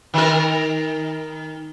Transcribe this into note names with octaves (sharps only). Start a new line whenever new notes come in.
D#3 A#4